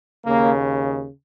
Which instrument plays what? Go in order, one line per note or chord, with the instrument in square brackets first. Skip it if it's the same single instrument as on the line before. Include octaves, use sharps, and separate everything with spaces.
[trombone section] D#2 C#3 A#3